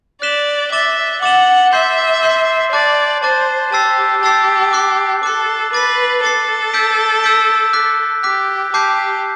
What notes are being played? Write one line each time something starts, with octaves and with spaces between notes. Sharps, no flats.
D5 F#6 B6 E7 G7
E5 D6 A6 E7 G7
F#5 D6 A6 E7 G7
E5 C6 G6 C7
C6 G6 C7
D5 A5 D6 F#6 A6
C5 A5 D6 F#6 A6
G4 A5 E6 A6 C7
G4 A5 E6 A6 C7
D6 F#6 C7
A4 D6 F#6 C7
B4 D6 A6 C7
A4 D6 A6 C7
E6 G6 B6 D7
E6 G6 B6 D7
D6 F#6 B6
G4 D6 F#6 B6
G4 A5 D6 G6 C7